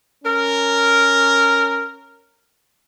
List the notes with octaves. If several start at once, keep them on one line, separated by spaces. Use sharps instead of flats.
C#4 A#4